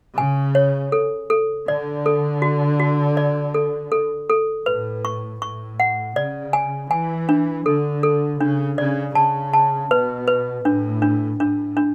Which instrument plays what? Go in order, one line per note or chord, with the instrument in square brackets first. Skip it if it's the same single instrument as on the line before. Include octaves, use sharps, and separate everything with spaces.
[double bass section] C#3 [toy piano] G#5
[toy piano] C#5
A4
A4
[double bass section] D3 [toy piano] D5
[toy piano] A4
F#4
F#4
D5
A4
A4
A4
[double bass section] A2 [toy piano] B4
[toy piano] C#6
[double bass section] A2 [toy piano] C#6
[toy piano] F#5
[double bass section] C#3 [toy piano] D5
[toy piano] G#5
[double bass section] E3 [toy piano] G#5
[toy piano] D4
[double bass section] D3 [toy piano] A4
[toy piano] A4
[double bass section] C#3 [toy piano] D4
[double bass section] C#3 [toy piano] D5
[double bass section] C#3 [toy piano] A5
[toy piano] A5
[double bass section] B2 [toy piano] B4
[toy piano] B4
[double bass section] A2 [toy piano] D4
[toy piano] D4
[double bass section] A2 [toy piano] D4
[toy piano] D4